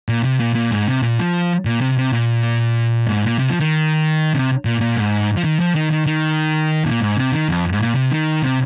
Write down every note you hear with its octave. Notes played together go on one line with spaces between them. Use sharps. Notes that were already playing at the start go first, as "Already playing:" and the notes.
A#2
C3
A#2
A#2
G#2
C3
A#2
F3
A#2
C3
C3
A#2
G#2
A#2
C3
F3
D#3
C3
A#2
A#2
G#2
F3
D#3
F3
D#3
D#3
D#3
A#2
G#2
C3
D#3
F2
G#2
A#2
C3
D#3
C3